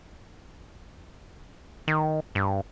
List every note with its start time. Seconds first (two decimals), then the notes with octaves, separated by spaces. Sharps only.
1.88 D#3
2.35 G2